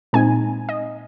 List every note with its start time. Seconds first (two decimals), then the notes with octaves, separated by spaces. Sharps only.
0.13 A#2 G#3 C4 D#4 G#5
0.69 D#5